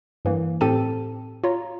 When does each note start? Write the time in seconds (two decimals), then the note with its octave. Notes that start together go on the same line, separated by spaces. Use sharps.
0.25 G2 E3 A#3
0.61 A2 C4 G4 A4 A5 D#7
1.44 F4 C#5 A#5